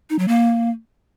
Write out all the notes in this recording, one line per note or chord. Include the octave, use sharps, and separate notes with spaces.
D#4
F#3
A#3